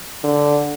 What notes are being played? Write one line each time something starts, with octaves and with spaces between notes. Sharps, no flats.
D3